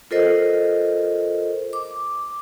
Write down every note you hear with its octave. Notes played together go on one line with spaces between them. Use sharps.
F4 A4 A#4 C5 D#5
D6